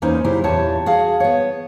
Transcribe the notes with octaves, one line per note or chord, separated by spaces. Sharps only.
E2 A#3 C#4 D#4 C5
C#3 F#3 E4 G4 C5
E2 A#2 G4 C#5 A5
F#4 G#4 F5
B3 C#5